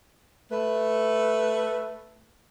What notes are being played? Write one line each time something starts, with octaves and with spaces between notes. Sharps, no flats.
A3 B4